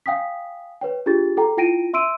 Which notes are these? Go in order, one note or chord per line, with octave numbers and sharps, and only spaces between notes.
F5 G5 G#5 D#6 B6
B4 C#5 G5
D4 F4 G4 G#4 A6
A4 G5 A#5
E4 F4 G5 A#6 D7 D#7
E5 C6 E6 D7 D#7